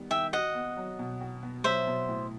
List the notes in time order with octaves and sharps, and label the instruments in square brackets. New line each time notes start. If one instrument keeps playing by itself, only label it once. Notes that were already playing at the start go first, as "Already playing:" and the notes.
Already playing: [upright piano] D#3 G3 B3 D#4
[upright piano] D#3 [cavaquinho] E5 G5
[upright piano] F#4 [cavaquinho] D#5 F#5
[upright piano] B3
F#3
B2
F#4
B3
[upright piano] F#3 [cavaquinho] C5 E5
[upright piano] B2
A2